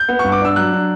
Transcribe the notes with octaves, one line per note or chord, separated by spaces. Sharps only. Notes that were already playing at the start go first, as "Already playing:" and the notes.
Already playing: G6
B3
C#6
G2
D6
D4 E6
F#3 F#6
D4